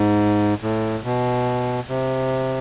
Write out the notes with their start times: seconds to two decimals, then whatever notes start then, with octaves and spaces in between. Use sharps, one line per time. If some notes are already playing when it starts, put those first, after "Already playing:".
Already playing: G#2
0.62 A2
1.04 B2
1.89 C3